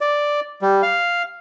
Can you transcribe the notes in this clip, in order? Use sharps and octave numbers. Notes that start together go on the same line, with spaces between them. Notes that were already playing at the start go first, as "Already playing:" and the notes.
D5
G3
F5